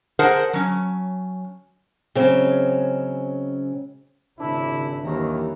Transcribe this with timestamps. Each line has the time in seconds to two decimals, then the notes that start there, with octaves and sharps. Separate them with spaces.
0.19 G#4 A#4 C5 F#5 A5
0.53 F#3 C#4
2.15 C#3 F#3 G#3 C4 C#4
4.40 G#1 C#3 D4 E4 E5
5.05 D#2 D#3 E3 G3 C#5 A#5